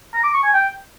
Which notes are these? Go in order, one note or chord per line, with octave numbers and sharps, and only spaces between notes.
A#5
D6
C#6
G#5
G5